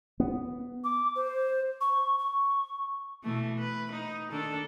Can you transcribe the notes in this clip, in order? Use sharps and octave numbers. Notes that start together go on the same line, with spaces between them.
B3
D6
C5
C#6
C#6
B2 E3 A3
B4
D#4
D#3 D4 A4